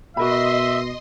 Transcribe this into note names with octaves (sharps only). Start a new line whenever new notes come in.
B2 F#4 A#4 D#5 E5 B5 C6